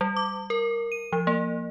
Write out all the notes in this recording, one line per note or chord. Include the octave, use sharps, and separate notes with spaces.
G3
D6
A#4
D#7
F3
A#3